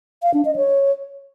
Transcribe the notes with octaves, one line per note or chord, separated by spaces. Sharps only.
F5
D4
D#5
C#5